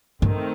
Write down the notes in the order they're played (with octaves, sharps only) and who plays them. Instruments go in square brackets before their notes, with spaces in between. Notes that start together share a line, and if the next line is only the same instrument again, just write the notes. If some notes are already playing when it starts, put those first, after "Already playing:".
[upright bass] G2 [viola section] D#3 A3 C4